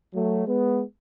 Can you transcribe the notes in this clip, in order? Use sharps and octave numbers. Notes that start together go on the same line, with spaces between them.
F#3 A3
G#3 B3